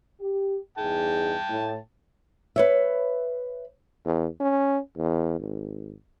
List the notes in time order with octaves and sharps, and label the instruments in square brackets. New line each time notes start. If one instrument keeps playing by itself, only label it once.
[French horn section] G4
[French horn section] E2 D#4 G#4 [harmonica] G5 A5
[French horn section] A2
[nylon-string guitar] B4 C#5 E5
[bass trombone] E2
C#4
E2
G#1